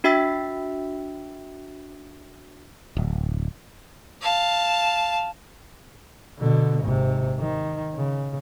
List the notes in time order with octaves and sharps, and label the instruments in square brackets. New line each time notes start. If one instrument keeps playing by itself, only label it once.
[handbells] D4 F#4 E5 G5 E6 B6
[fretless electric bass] D1
[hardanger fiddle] F5 A5
[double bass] B2 D3
G#1 C3
D#3
C#3